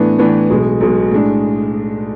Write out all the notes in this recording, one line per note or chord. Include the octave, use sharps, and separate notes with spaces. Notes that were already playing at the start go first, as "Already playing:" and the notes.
Already playing: A2 E3 B3 D4
A2 E3 B3 D4
B1 B2 G#3
B1 B2 G#3
A2 G#3 D4